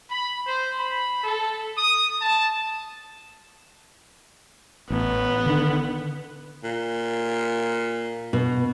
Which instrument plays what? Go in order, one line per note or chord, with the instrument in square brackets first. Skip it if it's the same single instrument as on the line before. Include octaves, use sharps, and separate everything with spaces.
[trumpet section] B5
C5
B5
A4
D#6
A5
[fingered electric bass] A1 [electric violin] B3
[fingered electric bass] D3 D#3
[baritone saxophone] A#2
[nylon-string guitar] B2